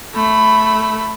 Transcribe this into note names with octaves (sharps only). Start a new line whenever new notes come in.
A3 B5